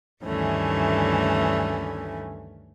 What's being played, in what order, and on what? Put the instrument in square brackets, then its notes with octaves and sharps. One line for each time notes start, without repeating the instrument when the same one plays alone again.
[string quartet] D2 G2 D#3 E3 A3 C#4